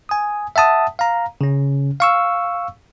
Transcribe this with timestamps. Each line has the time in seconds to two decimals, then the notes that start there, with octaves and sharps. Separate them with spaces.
0.09 G#5 D#6
0.56 E5 F#5 A5 D#6
0.99 F5 A#5
1.41 C#3 C#4
2.00 F5 C#6 E6